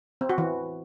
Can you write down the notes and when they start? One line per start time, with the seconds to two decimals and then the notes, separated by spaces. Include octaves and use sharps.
0.21 C4
0.29 F#4
0.38 E3